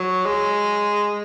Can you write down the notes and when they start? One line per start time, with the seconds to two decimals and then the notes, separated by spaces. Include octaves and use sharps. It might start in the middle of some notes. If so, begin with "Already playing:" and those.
Already playing: F#3
0.26 G#3